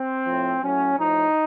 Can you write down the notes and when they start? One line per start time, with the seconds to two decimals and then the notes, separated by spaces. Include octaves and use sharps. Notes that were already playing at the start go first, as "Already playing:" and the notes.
Already playing: C4
0.26 A2 F3
0.63 A2 F#3 C#4
0.99 A2 F3 D#4